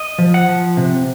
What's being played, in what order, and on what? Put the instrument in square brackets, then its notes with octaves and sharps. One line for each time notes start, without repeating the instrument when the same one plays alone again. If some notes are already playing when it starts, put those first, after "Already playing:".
Already playing: [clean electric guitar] D#5
F3
F#5
F3
C3